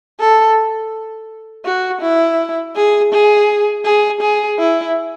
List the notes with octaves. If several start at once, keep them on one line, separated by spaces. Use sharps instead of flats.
A4
F#4
E4
G#4
G#4
G#4
G#4
E4